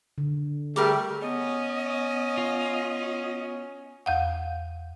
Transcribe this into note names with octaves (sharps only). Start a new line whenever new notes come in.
D3
G3 A3 G4 G#4 A#4 D6
B3 C#4 D#5
F4
E2 F5 F#5